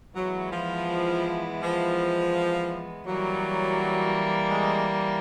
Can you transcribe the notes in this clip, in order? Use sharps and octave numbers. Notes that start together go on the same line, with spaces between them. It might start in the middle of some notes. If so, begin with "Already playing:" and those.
E3 F#3 G#3 B3 E4
F3
F3
E3 F#3 G3 A#3
G#3